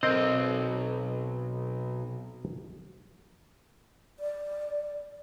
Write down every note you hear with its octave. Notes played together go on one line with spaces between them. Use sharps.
B1 C4 A#4 D#5
D5